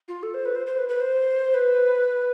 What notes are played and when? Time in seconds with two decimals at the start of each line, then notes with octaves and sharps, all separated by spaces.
0.08 F4
0.23 A4
0.34 C5
0.45 B4
0.55 C5
0.67 C5
0.78 B4
0.89 B4
1.01 C5
1.54 B4